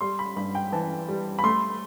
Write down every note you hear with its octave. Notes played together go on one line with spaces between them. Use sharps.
G3 C6
B5
G2 B5
G5
E3 A5
G3
B5
A3 C6